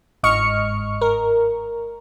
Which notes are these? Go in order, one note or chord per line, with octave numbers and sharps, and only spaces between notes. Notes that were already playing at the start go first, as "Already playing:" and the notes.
G1 G#2 D#5 C#6 F6 C#7
A#4